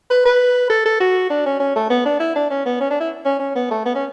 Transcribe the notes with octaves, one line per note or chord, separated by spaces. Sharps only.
B4
B4
A4
A4
F#4
D4
C#4
C#4
A3
B3
D4
E4
D4
C#4
B3
C#4
D4
E4
C#4
C#4
B3
A3
B3
C#4